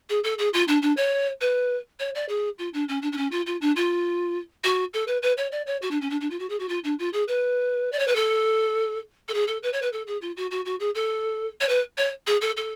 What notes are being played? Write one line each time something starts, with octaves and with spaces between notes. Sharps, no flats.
G#4
A4
G#4
F4
D4
D4
C#5
B4
C#5
D5
G#4
F4
D4
C#4
D4
D4
C#4
F4
F4
D4
F4
F#4
A4
B4
B4
C#5
D5
C#5
F#4
D4
C#4
D4
D4
F4
F#4
G#4
F#4
F4
D4
F4
G#4
B4
D5
C#5
B4
A4
A4
G#4
A4
B4
C#5
B4
A4
G#4
F4
F#4
F#4
F#4
G#4
A4
C#5
B4
C#5
G#4
A4
A4